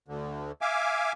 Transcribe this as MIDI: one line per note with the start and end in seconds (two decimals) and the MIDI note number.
0.08 0.52 38
0.08 0.52 50
0.61 1.13 76
0.61 1.13 77
0.61 1.13 80
0.61 1.13 86